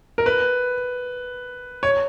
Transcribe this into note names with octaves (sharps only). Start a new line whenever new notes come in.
A#4
B4
C#5